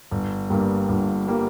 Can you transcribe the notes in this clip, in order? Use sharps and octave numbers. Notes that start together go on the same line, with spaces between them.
G1
G2 G3 A#3
G1
G3 A#3